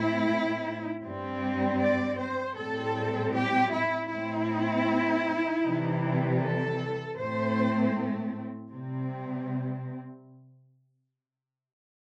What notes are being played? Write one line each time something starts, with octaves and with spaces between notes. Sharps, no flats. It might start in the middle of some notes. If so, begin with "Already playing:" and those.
Already playing: A2 A3 C4 E4
G2 G3 C4
D5
C5
A2 G3 C4 A4
G4
E4
A2 A3 C4 E4
C3 E3 G3
A4
A2 A3 C4 C5
C3 G3 C4